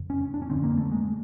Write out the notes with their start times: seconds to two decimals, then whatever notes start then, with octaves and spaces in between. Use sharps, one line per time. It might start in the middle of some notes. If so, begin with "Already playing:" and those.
Already playing: F2 C#3
0.10 C#4
0.34 D4
0.42 C#4
0.50 F2 D3 C4
0.63 A#3
0.78 A3
0.92 G#3